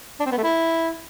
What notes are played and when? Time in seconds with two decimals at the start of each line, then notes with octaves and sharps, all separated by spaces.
0.20 D4
0.26 C4
0.32 B3
0.38 A3
0.43 E4